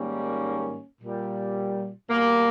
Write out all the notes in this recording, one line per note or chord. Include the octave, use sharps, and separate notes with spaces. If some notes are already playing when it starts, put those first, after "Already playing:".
Already playing: G#2 D#3 G3 A#3 C#4
A#2 G3
B2 G3 A#3